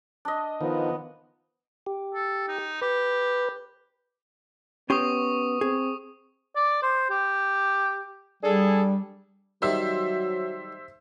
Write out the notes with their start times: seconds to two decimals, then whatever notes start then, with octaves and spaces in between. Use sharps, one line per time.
0.25 D4 D#5
0.61 D#3 F3 B3
1.87 G4
2.14 A4
2.48 D#4
2.81 G4 B4
4.90 B3 C#4 G4 C6 C#6 D#6
5.61 C4 G#4
6.56 D5
6.82 C5
7.10 G4
8.43 G3 D4 G#4 A4
9.62 D#3 F#3 G3 C5 E5